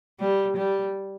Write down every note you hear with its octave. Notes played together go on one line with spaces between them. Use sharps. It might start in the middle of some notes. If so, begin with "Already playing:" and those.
G3
G3